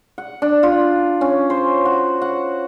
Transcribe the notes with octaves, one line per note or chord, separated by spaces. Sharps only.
F#5
D4
F4
C#4
C5
F#4
F#5